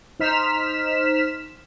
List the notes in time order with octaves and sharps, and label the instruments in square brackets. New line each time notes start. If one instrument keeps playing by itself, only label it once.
[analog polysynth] D#4 C5 F6 B6 E7